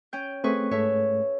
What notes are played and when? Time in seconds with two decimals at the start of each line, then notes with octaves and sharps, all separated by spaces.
0.13 C#4 G5 G6
0.44 A3 C4 G#4 B4 C#6
0.71 G#2 A3 C#5 E5